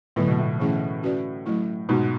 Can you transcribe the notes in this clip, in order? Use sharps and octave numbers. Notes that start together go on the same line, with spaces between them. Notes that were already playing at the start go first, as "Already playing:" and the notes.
A2 D3 F#3 B3 E4 B4
B2
A2
E3 A3 C#4 E4 G#4
C#4 F#4 B4 D5
F#3 A3 E4
G#2 B2 G#3 B3 F#4